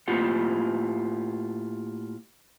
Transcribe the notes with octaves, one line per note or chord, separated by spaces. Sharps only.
A2 A#3 F4 G4 F#5